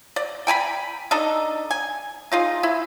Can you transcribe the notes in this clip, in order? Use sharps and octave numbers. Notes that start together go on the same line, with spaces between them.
D5
G5 G#5 A#5 B5
D4 D#4 A4 D#5
G#5
D#4 F4 G#4
E4